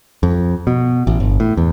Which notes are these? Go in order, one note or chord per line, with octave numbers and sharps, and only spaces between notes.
F2
B2
A1
G1
A2
E2